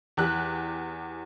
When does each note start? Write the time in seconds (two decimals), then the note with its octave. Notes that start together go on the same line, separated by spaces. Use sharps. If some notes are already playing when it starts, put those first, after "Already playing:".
0.17 E2 G4 F#6